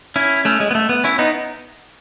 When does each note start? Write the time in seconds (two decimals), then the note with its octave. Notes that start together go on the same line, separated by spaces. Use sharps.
0.16 C#4 E4
0.45 A3 C#4
0.60 G#3
0.71 B3
0.75 A3
0.89 B3
1.04 C#4 E4
1.19 B3 D#4